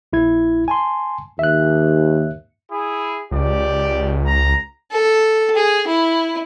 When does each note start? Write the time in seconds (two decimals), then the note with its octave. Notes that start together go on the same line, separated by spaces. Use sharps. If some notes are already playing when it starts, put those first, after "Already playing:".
0.13 A#1 E4 G#6
0.68 G#5 A5 C6
1.39 D#2 E5 F#6
2.71 E4 G#4
3.31 C#2 G4 D5
4.26 A#5
4.92 A4
5.56 G#4
5.87 E4